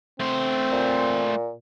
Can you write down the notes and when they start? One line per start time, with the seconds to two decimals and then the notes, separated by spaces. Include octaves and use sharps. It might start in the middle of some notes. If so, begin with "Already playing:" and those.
0.20 A3 C4 C5
0.72 A#2